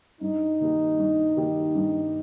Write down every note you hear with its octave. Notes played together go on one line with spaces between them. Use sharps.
G2 D#4
D#3 A#3 G4
G2
D#3 A#3 G4
G2